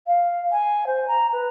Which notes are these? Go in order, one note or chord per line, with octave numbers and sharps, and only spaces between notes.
F5
G#5
C5
A#5
B4